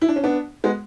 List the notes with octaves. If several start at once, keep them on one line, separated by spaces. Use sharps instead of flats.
E4
D4
C#4
B3 D4
G#3 B3